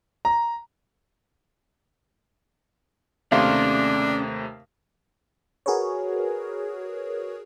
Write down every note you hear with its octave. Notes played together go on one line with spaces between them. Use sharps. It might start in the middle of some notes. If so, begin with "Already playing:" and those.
A#5
D#2 C3 A3 C#4 D4 G#4 F5 C6
F#4 G#4 A#4 B4 C#5